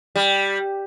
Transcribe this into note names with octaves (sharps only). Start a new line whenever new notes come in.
G3